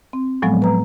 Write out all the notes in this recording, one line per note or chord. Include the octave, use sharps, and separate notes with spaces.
C4
A2 F3 F#3 G#3 B3
B4 A#5